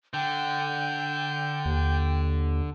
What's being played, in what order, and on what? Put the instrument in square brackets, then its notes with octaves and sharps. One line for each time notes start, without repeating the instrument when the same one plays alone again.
[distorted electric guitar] D3 [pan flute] G5 [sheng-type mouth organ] G6
[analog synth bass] D#2